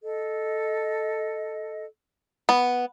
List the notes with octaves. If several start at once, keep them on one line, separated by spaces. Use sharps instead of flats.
A4 D#5
B3